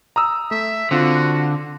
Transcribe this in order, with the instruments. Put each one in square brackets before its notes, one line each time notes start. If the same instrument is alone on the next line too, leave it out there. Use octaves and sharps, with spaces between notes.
[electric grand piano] A#5 D#6 E6
[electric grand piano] A3 [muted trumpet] E5
[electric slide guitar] D3 [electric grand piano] C4 F4 [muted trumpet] F#4